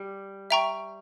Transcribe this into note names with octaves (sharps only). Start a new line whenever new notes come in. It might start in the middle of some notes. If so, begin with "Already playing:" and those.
Already playing: G3
E5 G5 A#5 C#6